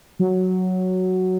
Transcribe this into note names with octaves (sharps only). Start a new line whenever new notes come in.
F#3